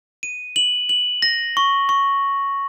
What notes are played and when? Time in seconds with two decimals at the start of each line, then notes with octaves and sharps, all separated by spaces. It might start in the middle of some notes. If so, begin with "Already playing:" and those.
0.23 D#7
0.56 F#7
0.89 F#7
1.22 A#6
1.57 C#6
1.89 C#6